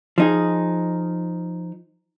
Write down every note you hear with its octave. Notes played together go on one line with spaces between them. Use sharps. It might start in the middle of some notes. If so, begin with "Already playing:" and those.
F3 D#4 G#4